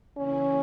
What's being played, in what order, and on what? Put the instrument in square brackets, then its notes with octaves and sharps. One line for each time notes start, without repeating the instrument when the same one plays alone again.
[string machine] C#3 E3 A#3 E4 [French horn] C#4